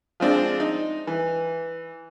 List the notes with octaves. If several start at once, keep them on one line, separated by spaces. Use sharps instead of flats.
F3 G#3 C4 D4
D#4
E3